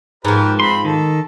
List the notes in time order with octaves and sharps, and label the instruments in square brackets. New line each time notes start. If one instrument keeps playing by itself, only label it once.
[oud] G#2 F3 [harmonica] G4 A#4 B4
[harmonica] C4 B5 [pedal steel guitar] C6
[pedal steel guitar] D#3 [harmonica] A4